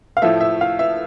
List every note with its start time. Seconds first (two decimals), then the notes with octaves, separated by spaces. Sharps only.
0.17 F5
0.22 A2 F3 A3 E5
0.41 E5
0.61 F5
0.79 E5